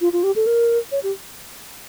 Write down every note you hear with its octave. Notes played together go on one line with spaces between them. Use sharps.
F4
F4
G4
A4
A#4
C#5
G4